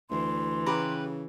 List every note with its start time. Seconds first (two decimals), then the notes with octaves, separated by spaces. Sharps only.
0.10 D2 E3 C6
0.66 C#3 G4 B4 A#5